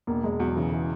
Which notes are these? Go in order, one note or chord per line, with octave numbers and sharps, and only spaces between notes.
E1 A#3
E1 G#3
E2 F#3
C#3 E3
E3